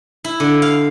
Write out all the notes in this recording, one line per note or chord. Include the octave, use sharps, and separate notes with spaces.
E4
D3
F5